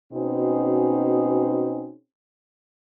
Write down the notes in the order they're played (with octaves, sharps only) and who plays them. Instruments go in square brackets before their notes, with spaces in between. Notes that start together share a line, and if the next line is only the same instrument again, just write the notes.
[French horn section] B2 C4 C#4 D#4 F#4 G#4